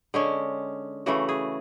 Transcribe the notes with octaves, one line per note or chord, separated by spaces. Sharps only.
D3 G#3 C#4
C#3 E3 A3 F#4
G#4